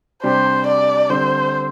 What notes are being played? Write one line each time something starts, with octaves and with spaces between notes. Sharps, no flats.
C3 G3 D4 G4 C5
D5
D3 G3 C4 C5